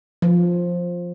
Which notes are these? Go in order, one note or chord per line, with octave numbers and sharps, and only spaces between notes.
F3